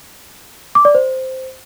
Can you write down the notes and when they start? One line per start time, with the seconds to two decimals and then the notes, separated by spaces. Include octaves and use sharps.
0.75 D6
0.85 D5
0.95 C5